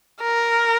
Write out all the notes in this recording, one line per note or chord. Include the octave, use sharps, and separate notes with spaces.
A#4